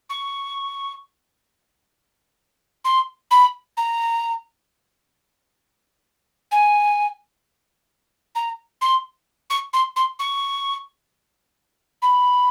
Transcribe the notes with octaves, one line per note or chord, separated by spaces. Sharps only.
C#6
C6
B5
A#5
G#5
A#5
C6
C#6
C6
C6
C#6
B5